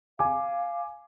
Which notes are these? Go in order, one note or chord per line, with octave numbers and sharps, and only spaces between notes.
F5 G#5 D6